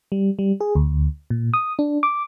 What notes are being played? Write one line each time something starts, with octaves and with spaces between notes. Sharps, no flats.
G3
G3
G#4
D2
A#2
D#6
D4
D6